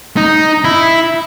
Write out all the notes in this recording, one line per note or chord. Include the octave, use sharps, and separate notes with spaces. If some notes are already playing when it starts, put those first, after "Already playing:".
D#4
E4